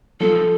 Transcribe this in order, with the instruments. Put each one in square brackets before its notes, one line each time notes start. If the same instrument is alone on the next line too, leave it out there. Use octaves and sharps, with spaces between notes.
[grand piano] F3 [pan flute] A4